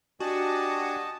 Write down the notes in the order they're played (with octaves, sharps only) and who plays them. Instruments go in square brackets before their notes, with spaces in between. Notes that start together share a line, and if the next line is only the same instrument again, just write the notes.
[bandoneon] D4 G4 G#5 [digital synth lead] F#4 [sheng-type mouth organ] D#5 A5